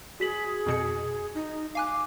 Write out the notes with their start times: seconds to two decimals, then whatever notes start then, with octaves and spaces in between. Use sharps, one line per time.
0.20 F#4 G#4 B6 F#7
0.66 F2 B2 C#7
1.34 D#4
1.75 F5 G#5 D6 F#6